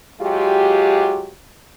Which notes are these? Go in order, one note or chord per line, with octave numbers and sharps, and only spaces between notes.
F#3 G#3 F4 G4